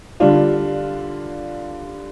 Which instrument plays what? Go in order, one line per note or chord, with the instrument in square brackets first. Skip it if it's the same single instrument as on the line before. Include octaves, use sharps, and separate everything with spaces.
[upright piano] D3 G3 D4 F4